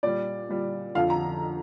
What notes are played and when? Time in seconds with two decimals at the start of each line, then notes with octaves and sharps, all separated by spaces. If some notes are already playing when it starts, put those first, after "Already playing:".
0.03 A#2 G3 D5
0.49 A#2 G3
0.95 F2 D3 F3 F5
1.10 A#5